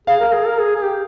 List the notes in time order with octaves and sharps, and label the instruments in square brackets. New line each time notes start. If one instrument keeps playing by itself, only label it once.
[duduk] G#4 [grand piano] F5
[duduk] A#4
G#4
A#4
G#4
G#4
G4